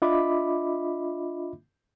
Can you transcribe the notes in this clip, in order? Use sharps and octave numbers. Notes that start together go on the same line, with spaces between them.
D4 F4 D#5 E5 B5 D6